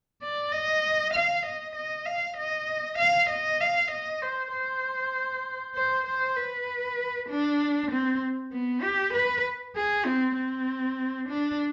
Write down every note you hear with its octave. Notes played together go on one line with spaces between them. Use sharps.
D5
D#5
F5
D#5
D#5
F5
D#5
F5
D#5
F5
D#5
C5
C5
C5
C5
B4
D4
C4
B3
G4
B4
G#4
C4
C4
D4